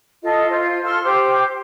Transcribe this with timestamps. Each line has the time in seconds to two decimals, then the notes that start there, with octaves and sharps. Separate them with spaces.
0.22 F4 A4 D#5
0.49 F4 C5
0.83 A4 C6 F6
1.04 G4 C5 D6